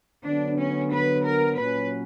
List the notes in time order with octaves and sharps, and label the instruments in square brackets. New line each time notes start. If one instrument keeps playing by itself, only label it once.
[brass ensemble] D3 F#3 B3 [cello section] D4
[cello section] C#4
B4
A#4
[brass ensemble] A#2 F#3 C#4 [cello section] B4